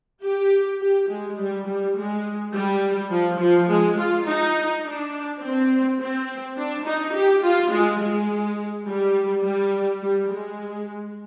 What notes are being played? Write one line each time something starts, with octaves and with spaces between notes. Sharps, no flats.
G4
G4
G#3
G3
G3
G#3
G3
F3
F3
G#3
F4
D#4
D4
C4
C4
D4
D#4
G4
F4
G#3
G#3
G3
G3
G3
G#3